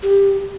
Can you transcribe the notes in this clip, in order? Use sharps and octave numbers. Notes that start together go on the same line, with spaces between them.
G4